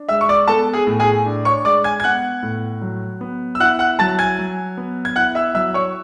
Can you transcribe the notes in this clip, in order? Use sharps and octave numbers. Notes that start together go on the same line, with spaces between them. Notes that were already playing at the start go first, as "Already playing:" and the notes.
Already playing: D4
G#3 E5 E6
C#6
D5 D6
B3 A4 A5
G#4 G#5
A2
G#4 G#5
D4
C#5 C#6
G#3 D5 D6
G#5 G#6
G#6
B3 F#5 F#6
A2
F#3
B3
E6
E4 F#5 F#6
F#5 F#6
F#3 A5 A6
G#5 G#6
F#3
B3
G#6
E4 F#5 F#6
E5 E6
F#3 E5 E6
C#5 C#6